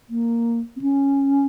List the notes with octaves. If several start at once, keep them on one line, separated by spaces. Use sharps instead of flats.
A#3
C4
C#4